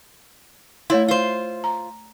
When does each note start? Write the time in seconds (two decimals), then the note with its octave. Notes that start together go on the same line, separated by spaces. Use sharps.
0.90 A3 E4 C#5 C6
1.08 F4 C5
1.64 A#5